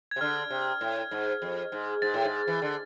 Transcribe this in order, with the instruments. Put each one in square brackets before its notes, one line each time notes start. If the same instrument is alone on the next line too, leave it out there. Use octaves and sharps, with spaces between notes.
[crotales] G#6
[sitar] C3
[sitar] D3 [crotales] F6
[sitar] C3
A2
G#2
F2
G#2
[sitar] G#2 [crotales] A6
[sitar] A2
G#2
E3
D3